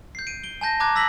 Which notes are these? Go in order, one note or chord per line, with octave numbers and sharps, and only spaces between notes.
G6 C7
D7 D#7
D7 G7
G#5 A5 G6 A#6
A5 A#5 D6 F#6 G#6
E6 A#6 B6 F#7